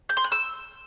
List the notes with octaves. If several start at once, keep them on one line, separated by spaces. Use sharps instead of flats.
G6
C6
F#6
E6